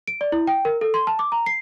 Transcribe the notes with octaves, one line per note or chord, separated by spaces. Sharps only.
D7
D5
E4
G5
A#4
A4
C6
A5
D6
A#5
C7